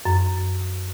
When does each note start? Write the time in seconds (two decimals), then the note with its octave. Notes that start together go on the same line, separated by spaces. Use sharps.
0.05 F#2